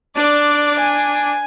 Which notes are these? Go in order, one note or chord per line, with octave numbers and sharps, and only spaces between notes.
D4 D5
G#5